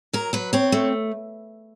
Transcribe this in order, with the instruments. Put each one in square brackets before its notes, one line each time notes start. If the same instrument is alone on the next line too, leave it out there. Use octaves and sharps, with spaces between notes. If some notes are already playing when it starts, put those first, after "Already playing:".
[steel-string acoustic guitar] F#3 A#4
F#3 B4
C4 C#5
A3